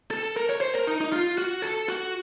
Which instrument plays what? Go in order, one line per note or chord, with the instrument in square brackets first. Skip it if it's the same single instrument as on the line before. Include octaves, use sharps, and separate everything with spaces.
[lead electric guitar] A4
A#4
C#5
C5
A#4
D#4
D#4
F4
F#4
A4
F#4